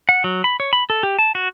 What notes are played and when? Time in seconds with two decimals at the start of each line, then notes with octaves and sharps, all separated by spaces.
0.09 F#5
0.24 F#3
0.44 B5
0.60 C#5
0.73 B5
0.90 A4
1.03 G4
1.19 A5
1.35 F#4